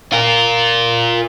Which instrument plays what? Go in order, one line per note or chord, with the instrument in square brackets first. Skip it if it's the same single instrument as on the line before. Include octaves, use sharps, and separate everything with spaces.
[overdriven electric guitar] F4 A#4